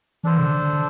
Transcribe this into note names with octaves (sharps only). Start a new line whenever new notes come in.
E3 D4 A4 C5
C3
D3
D3
D3